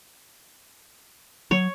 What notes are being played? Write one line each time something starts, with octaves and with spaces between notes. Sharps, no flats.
F#3 C#5